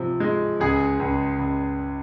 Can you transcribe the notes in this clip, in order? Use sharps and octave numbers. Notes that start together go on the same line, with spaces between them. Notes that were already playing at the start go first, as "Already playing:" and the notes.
Already playing: C3 F3
G#3
C#2 G#4
C#2
C#2